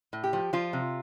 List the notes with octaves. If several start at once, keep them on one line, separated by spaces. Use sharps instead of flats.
A2
G4
F3
F3 F4
C3